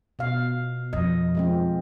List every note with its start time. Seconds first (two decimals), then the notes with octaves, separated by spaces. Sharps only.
0.19 B2 F5
0.93 F2 D#5
1.35 F3 G#3 C4